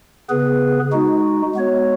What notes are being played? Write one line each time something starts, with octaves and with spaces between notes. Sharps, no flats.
C#3 B3 G#4 B4
G#3 D#4 F#4
G#3 B3 F#4 C#5